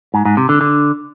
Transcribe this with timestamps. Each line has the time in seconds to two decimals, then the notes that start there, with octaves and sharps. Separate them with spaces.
0.14 G#2
0.25 G#2
0.37 C3
0.49 D3
0.61 D3